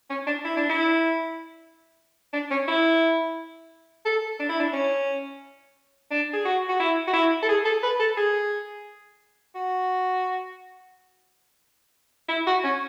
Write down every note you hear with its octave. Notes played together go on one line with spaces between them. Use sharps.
C#4
D4
E4
D4
E4
D4
C#4
E4
A4
D4
E4
D4
C#4
D4
G#4
F#4
F#4
E4
F#4
E4
A4
G#4
A4
B4
A4
G#4
F#4
E4
F#4
C#4